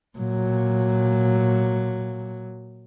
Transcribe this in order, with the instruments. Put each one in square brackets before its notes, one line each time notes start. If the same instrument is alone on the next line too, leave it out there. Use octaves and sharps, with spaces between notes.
[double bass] A#2 F#3